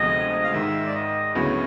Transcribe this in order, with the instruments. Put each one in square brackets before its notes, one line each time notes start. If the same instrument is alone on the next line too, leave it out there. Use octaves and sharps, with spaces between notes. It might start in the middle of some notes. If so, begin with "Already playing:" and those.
Already playing: [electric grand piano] D2 C3 F3 G#3 B3 [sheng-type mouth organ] D#5
[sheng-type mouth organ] F5
[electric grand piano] G#2 D#3 G#3 [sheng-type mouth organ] E5
[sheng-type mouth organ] D5
D#5
[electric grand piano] D2 C#3 F#3 B3 E4 [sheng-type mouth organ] C#5